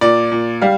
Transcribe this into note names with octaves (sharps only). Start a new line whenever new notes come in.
A#2 D5
A#2
G3 F5